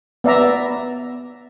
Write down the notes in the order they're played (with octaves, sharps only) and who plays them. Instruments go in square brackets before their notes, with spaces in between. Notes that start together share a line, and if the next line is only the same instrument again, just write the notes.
[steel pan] B3 D5 E5 A#5